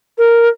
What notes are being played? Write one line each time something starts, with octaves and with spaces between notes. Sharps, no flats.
A#4